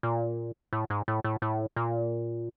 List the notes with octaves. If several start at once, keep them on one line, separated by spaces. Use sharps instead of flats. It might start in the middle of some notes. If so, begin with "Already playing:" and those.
A#2
A2
G#2
A2
A2
A2
A#2